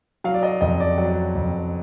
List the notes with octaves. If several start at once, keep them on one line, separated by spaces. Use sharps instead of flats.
F#3 F5
D5
D#5
F2 D#5
D5
F#3
F2